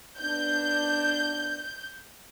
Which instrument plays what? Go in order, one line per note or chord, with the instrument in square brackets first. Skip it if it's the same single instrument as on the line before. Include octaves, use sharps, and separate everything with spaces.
[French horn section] B3 D4 [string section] G6